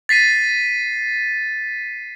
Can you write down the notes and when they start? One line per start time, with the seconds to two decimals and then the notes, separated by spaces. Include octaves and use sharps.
0.09 A6 B6 C7 D#7